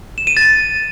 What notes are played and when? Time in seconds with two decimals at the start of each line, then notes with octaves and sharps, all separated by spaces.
0.18 E7
0.27 D#7
0.37 A6